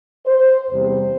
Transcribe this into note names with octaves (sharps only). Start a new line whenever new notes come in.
C5
E2 C3 G3 C5